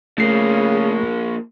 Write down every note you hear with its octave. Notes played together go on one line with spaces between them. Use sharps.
C#3 F3 A3 A#3 C7